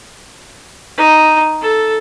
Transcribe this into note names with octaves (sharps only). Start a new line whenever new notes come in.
D#4
A4